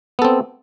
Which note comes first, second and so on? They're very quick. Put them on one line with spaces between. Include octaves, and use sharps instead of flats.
B3 A4 C4